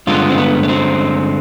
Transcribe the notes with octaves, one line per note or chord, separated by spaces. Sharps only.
G2 D3 G#3 B3 F4
C4
B3
B3
C4